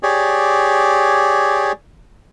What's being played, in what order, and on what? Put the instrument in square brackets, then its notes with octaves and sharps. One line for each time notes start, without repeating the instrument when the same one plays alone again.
[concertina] G4 G#4 C#5 D5